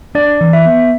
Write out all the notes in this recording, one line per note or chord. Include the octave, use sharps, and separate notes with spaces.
D4 D5
E3
E5
B3